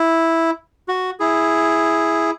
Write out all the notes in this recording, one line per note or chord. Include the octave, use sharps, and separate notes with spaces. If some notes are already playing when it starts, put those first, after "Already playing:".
Already playing: E4
F#4
E4 G#4